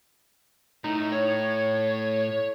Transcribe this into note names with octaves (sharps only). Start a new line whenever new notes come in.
A2 D#4
C#5